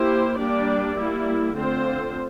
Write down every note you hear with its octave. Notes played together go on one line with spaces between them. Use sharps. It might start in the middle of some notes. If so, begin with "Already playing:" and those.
Already playing: A#3 E4 G4 C5
G3 A#3 D4 G4 D5
G3 A#3 E4
D3 A3 C4 F4 C5